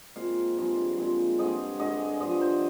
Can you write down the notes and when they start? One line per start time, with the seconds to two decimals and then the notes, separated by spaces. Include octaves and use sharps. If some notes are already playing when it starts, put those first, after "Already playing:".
0.16 A#2 G#3 C4 F5
0.57 G2 F3 G#3 C4
0.98 A#2 G#3 C4
1.39 G2 D3 G#3 C4 D#5
1.79 G2 D3 G#3 D#5
2.20 G2 D3 F3 D#5
2.41 C5